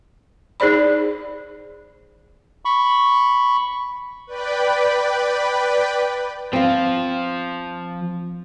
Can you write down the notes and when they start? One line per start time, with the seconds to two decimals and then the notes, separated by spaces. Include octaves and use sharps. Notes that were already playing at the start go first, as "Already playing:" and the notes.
0.60 D#4 G#4 C5 D5 B5
2.65 B5 C#6
4.27 B4 D5 G5 B5
6.53 F3 C4 F4